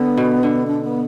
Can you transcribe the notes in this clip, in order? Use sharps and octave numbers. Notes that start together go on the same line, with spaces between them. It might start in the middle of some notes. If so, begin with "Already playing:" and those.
Already playing: D3 B3
B2
D3
D4
B3